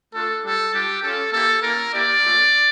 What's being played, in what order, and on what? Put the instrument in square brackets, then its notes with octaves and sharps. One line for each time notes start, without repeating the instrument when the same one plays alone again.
[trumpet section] A3 D4 F4 A4
G3 D4 G4 A4
G3 D4 F4 G4
C#4 F4 A4
A#3 E4 G4 A4
A#3 C#4 E4 A#4
A#3 E4 G4 D5
A3 C#4 F4